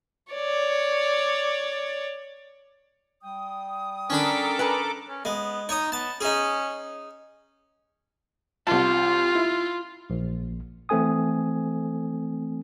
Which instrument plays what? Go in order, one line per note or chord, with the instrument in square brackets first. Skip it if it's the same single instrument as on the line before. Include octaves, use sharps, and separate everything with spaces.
[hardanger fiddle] C#5 D5
[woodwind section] G3 G5 D#6
[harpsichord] C#4 D4 B5 [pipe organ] A4 A#4 D6
[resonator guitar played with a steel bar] B4 G#5 A#5
[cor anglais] C#4
[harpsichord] G#3 [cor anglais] B3
[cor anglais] D#4 [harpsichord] C#5 D#6
[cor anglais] B3 [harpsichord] A5
[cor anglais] C#4 [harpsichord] D#4 G#4
[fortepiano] C2 A5 [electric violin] F4
[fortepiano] E4
[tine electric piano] A#1
E3 A3 C4 A4 G#5 D#6